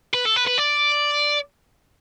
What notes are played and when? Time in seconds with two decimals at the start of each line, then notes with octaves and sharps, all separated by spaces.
0.14 B4
0.25 A4
0.36 B4
0.47 B4
0.58 D5